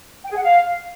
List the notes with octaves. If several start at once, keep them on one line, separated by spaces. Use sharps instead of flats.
G5
G#4
F#5
F5